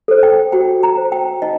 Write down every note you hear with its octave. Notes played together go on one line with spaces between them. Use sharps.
A4 C5
G5
F#4 G5
A#5
C5
G5
D#4 D#5